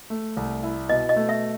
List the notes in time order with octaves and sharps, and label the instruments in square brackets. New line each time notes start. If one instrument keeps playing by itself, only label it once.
[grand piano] A3
C2
E4
[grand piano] B2 [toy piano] D#5
[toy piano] D#5
[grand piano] A3
[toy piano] E5